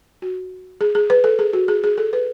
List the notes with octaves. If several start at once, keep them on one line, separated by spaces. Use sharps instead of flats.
F#4
G#4
G#4
B4
A4
G#4
F#4
G#4
G#4
A4
B4